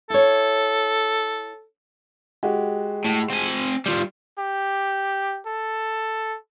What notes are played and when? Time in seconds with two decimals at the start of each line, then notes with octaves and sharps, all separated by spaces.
0.10 E4 A4 C#5
2.43 G#3 F#4 G4
3.04 A2
3.30 C4 G#5
3.86 G3 F4
4.39 G4
5.46 A4